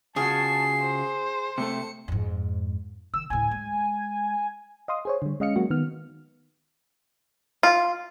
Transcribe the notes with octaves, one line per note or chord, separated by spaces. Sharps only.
C#3 F4 F#4 G#4 A5 C7
C5
C3 A3 A4 C#7
F2 G#2
D#3 E6
D2 A2 G#5
G#3
D#5 F5 C6 D#6
G#4 C5 C#5
D3 G3
G#3 C#4 D#5 F5 F6 C#7
F#3 G#3 A#3 F#4
D#3 B3 F6
F4